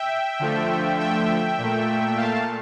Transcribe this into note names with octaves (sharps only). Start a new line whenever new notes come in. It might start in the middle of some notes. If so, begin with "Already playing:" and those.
Already playing: E5 G5
D3 F3 A3
E5 G5
A#2 A3
F5 A5